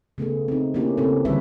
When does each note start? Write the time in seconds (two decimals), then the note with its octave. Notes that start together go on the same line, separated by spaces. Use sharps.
0.18 C#3 A3 B3 G#4
0.48 C4 D#4
0.74 A#3 B3 C#4 E4 G4
0.97 C#3 A3 C4 G4 A4
1.25 D3 E3 G3 B4 C#5 E5